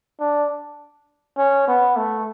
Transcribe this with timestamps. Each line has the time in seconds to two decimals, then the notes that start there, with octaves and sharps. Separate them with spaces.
0.20 D4
1.38 C#4
1.67 B3
1.96 A3